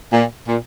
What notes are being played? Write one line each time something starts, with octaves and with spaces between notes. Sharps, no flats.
A#2
A#2